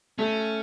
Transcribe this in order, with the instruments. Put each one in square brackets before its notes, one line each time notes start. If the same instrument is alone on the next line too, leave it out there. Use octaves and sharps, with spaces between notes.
[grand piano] A3 [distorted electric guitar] C#4